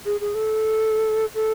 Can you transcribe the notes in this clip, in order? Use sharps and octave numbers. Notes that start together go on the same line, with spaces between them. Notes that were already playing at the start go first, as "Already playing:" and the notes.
G#4
G#4
A4
A4